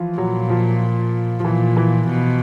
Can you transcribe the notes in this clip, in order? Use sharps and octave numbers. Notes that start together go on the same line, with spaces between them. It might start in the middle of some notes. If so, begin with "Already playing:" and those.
Already playing: E3 F3
A#2 F#3
F3
F3
A#2 E3
E3
B2